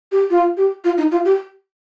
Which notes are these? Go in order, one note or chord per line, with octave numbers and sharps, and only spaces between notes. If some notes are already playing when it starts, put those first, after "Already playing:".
G4
F4
G4
F4
D#4
F4
G4